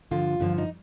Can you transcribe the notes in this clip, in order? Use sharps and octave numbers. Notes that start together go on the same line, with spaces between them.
G2 D3 F3 F4
G2 D3 F3
D#4